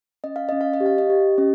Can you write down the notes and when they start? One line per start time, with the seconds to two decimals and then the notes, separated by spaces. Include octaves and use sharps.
0.24 C#4 D#5
0.36 F5
0.49 C#4 D#5
0.61 F5
0.73 D#5
0.80 G4
0.86 F5
0.98 D#5
1.10 G4
1.38 C#4 D#5